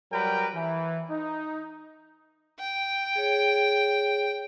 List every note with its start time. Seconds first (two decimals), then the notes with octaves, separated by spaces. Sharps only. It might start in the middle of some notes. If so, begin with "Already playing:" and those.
0.12 F#3 G3 A#4 B4 G5
0.55 E3
1.10 D#4
2.59 G5
3.15 G#4 C#5